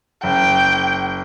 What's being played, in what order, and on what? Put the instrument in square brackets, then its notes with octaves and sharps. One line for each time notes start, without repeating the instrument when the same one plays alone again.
[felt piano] F#1 [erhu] G5